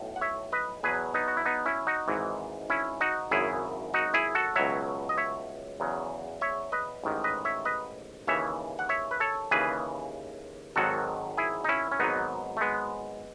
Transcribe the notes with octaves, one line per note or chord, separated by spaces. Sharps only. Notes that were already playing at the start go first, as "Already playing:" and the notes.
Already playing: B1 A2
F#5
C#5 E5
B4 D#5
E2 B2 F#3 G#4 B4
B3 D#4
F#4
E4
B3 D#4
C#4 E4
D#4 F#4
G#1 G#2 E3
C#4 E4
D#4 F#4
G#1 F#2 C#3 E4 G#4
D#4 F#4
E4 G#4
F#4 A4
C#2 B2 F#3 C#5 E5
D#5
C#5 E5
E2 C#3 F#3
C#5 E5
B4 D#5
A1 G#2 D#3
B4 D#5
C#5 E5
B4 D#5
D#2 C#3 E3 C#5 E5
F#5
C#5 E5
B4
A4 C#5
D#2 C#3 E3 G#4 B4
G#1 G#2 D#3 F#3 F#4 A4
E4 G#4
D#4
C#4 E4
C#4
G#1 G#2 F#3 B3 D#4
A3
G#3 B3